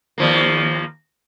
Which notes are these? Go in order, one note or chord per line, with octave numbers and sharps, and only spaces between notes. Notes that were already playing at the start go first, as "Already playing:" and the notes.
D#2 F3 A#3